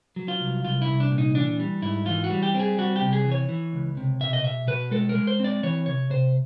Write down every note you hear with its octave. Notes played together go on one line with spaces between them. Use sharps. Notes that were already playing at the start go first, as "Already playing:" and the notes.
F#3
F4
C2
C2 F4
E4
C2
D4
A#2
D#4
E3 D4
G3
G#2 E4
E3 F4
F#4
G3
G4
C4
G#4
G3 F#4
G4
C3
G#4
E3
C#5
E3
C#2
C3
B2 E5
D#5
B2 E5
B2 B4
G#3 A4
A#4
G#3
C5
C4 D5
E3 C#5
C3 C#5
C3 C5